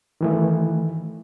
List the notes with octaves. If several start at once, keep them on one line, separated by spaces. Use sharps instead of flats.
D#3 E3 A3